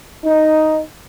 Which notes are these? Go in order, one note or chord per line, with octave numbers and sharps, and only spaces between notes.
D#4